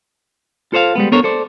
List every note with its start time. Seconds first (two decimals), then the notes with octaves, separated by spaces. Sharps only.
0.73 F4 A4 C5 D5 F5
0.95 G3 G#3 B3
1.12 B3 D4 A4 A#4 C5 C#5
1.24 A4 C5 D5